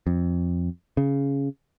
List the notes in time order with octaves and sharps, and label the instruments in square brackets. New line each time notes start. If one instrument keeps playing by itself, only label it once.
[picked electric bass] F2
C#3